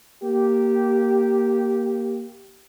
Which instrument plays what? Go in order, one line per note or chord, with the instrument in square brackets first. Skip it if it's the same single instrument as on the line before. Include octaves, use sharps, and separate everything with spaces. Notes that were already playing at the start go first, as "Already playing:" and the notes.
[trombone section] A#3 G4